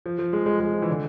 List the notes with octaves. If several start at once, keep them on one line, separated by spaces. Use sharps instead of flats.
F3
F3
G#3
G#3
G#3
F3
E3
D3